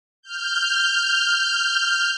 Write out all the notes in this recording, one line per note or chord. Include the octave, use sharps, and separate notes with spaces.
F6 G6